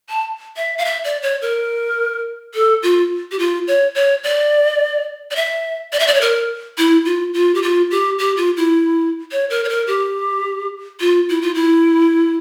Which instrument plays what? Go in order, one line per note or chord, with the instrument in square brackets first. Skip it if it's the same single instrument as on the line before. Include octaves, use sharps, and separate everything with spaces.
[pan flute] A5
E5
F5
E5
D5
C#5
A#4
A4
F4
G4
F4
C#5
C#5
D5
D5
E5
D5
E5
D5
C#5
A#4
E4
F4
F4
G4
F4
G4
G4
F4
E4
C#5
A#4
C#5
A#4
G4
F4
E4
F4
E4